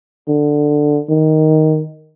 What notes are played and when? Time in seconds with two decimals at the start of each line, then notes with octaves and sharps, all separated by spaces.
0.28 D3
1.09 D#3